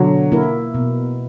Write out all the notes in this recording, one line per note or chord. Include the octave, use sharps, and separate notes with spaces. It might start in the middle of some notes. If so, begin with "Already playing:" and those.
Already playing: B2 D3 F#3
A#3 E4 A#4
B2